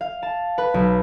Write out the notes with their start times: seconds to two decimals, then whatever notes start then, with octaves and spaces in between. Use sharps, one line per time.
0.01 F5
0.23 A5
0.58 B4
0.74 B1